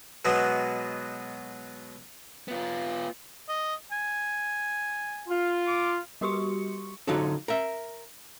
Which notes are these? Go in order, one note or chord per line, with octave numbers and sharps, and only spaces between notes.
B2 F#3 G#3 B3
B3 F4
D#5
G#5
F4
D6
G3 F#4 G4 C6 C#6 C#7
D3 F#3 D#4 F4 F#4 A4
A#4 E5